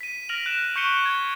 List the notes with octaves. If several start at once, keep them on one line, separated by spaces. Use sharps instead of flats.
B6 D#7
F6 A#6 D7 F7 F#7
F#6 D7 E7
C#6 G6 B6 C#7 D#7 G7
G#6